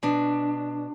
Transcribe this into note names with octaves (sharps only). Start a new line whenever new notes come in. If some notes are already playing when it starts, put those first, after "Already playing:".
B2 D4